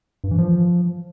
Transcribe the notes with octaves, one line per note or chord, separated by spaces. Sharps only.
G2
E3
F3